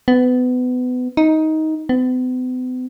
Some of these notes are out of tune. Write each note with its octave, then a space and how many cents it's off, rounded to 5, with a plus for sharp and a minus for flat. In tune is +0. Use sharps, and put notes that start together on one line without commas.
B3 +25
D#4 +15
B3 +45